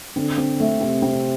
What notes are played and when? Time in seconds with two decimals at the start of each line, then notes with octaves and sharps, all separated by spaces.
0.16 D3 C4
0.38 C4
0.60 A3
0.81 C3 C4
1.02 C4